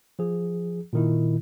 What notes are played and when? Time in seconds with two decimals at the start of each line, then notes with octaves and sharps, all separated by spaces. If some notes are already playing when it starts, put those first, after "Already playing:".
0.19 F3 G#4
0.93 A#2 D#3 E4